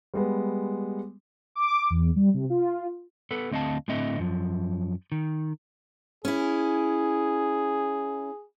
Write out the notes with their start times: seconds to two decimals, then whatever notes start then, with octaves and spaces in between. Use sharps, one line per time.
0.14 G3 G#3 B3
1.55 D6
1.90 E2
2.16 G3
2.34 C3
2.50 F4
3.31 B3 A4 B4
3.51 D2 C4 D#5 F5 A5
3.88 A2 D3 C4 D#5 E5
4.19 F#2 F3
5.12 D#3
6.25 C#4 E4 G#4